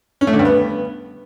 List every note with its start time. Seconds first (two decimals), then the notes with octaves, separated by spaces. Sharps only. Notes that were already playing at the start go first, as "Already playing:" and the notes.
0.21 C#4
0.27 A3
0.33 D3
0.39 G2
0.45 B3